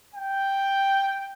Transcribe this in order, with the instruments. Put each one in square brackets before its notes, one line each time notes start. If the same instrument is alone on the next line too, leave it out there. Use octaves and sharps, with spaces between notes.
[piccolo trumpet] G5